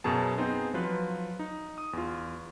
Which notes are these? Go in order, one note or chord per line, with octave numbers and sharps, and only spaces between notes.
F#2 B2 F#3 G#4 A5
B3 C4 D#4 G#4 C5
F3 F#3 F4 B4
D#4
D#6
E2 F4